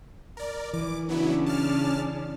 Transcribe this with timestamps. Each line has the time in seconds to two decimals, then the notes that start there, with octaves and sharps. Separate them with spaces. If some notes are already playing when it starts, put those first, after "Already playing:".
0.37 A#4 D5
0.73 E3 D6
1.09 C#3 F#3 B3 C#4 D4 E4
1.46 A5 F6